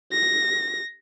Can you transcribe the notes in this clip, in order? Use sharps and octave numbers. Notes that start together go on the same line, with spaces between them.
A#6